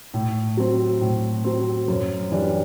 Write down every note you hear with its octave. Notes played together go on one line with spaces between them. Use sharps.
A2
F#3 C4
A2
F#3 C4
F#2
E3 G3 D4